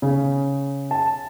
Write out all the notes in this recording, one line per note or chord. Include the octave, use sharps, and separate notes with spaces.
C#3
A5